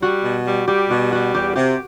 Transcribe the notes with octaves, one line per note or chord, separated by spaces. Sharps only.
G3 F#4
B2
G3
G3 G4
B2 F#4
G3 F#4
E2 G4
C3 G4